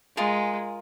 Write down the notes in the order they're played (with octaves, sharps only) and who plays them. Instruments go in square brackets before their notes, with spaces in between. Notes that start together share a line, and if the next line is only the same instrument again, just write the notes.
[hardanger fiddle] G#3 [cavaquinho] F4 G#4 A#4